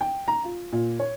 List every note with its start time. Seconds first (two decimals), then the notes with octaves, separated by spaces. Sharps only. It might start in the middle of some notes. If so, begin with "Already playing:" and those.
0.01 G5
0.28 A#5
0.44 F4
0.72 A#2
0.99 C#5